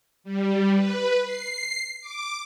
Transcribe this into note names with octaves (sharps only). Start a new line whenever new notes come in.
G3
B4
C7
D6